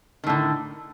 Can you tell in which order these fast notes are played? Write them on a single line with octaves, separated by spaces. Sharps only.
D#3 A2 D3